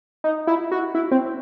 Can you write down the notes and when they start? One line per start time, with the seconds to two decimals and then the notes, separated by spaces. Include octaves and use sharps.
0.24 D#4
0.47 E4
0.71 F#4
0.95 E4
1.11 C4